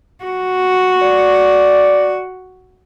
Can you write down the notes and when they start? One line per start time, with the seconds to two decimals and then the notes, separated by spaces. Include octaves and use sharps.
0.24 F#4
1.03 D5